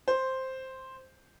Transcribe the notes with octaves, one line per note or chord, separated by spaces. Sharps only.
C5